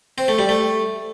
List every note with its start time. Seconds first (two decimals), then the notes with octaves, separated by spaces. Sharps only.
0.18 C4
0.28 A3
0.39 G3
0.49 A3